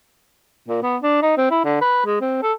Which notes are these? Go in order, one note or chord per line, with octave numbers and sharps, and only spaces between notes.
A#2
B3
D4
D#4
C4
E4
D3
B4
G#3
C4
A4